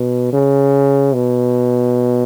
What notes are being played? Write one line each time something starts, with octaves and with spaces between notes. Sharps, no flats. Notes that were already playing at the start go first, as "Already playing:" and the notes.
Already playing: B2
C#3
B2